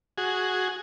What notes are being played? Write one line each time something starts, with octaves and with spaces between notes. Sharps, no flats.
F#4 G#4